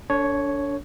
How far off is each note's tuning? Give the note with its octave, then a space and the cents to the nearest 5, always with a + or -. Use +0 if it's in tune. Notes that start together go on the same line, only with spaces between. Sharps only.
D4 -35 A4 +35 C#5 +0